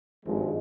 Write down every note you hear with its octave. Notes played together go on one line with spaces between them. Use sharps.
G#1 G2 F3 G#3